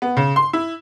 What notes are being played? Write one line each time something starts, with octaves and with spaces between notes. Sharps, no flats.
B3
C#3
C6
E4